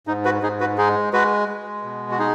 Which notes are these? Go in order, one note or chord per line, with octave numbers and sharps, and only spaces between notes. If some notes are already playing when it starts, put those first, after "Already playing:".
G#2 D#4
F#4 B4
G#2 D#4 G#4
F#4 B4
G#3 D#4 G#4
G#3 F#4 B4
G#3
B2
F#4
D#4 G#4